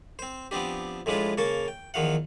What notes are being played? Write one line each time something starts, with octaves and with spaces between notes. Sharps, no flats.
C4 C5
F3 B3 C4 D4 G4
A2 F3 G#3 D4 F4 B4
C#3 A#3 A#4 A5 C#6
G5
E2 D#3 F3 F5 F#5